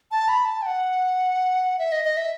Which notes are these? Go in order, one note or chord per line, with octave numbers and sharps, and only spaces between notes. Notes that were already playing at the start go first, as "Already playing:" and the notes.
A5
B5
A5
G5
F#5
E5
D#5
D#5
E5